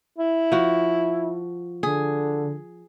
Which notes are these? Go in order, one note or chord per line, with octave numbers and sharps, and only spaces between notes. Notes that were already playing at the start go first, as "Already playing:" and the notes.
E4
F3 F#4
D3 G#4